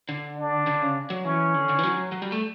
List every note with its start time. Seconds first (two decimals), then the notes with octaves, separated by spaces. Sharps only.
0.09 D3
0.38 D4
0.67 D3
0.82 C#3
1.10 F#3
1.25 E3 C#4
1.54 D3
1.69 D3
1.78 E3
1.83 F#3
1.97 F#3
2.12 F#3
2.22 G3
2.32 A3